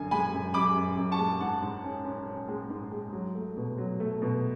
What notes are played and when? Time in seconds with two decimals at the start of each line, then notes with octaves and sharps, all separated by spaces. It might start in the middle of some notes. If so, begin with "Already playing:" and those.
Already playing: F#2 D3 G#5
0.11 G#3 G#5 B5
0.33 F#2
0.54 F#2 B5 D6
0.76 F#2
0.97 F#2
1.12 A5 C#6
1.20 G#3
1.40 G#2 F#5 A5
1.62 G#2
1.84 C#4
2.05 C#4
2.27 C#4
2.48 G#3
2.70 G#2
2.92 G#3
3.13 F#3
3.35 A3
3.57 B2
3.78 F#3
4.00 A3
4.22 B2